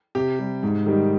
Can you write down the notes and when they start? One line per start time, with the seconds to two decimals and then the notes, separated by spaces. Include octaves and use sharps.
0.15 C3 G4
0.39 G3
0.63 G#2
0.86 D#3 G3